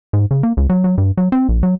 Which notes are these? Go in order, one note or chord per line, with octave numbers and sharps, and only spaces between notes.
G#2
C#3
A#3
C#2
F#3
F#3
G2
F#3
C4
A#1
F#3